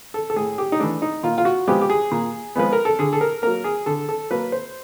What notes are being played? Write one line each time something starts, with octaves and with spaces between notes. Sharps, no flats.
A4
A4
A2 G#4
G4
D#4
E3 A3 D4
D#4
A#2 F4
F4
F#4
F3 G#3 B3 G4
G4
G#4
A#2
F3 G#3 B3 B4
A#4
A4
D3 G#4
A4
A#4
F#3 A#3 A#4
G#4
D3 A4
A4
F#3 A#3 B4
C5